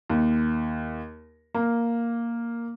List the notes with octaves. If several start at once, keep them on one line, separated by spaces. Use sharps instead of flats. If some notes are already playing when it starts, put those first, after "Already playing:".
D#2
A#3